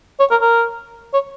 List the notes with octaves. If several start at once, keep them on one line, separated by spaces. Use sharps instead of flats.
C#5
A#4
A#4
C#5